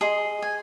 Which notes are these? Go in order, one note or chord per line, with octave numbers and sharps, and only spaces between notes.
G#4 D#5 C6
G#5